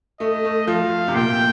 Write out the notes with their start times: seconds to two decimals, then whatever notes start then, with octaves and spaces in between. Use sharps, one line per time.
0.20 A3 D#5
0.45 A3
0.67 F3 F5
1.08 C3
1.15 A#2 G5